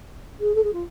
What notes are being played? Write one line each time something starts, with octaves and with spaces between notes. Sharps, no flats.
G#4
A4
G#4
F4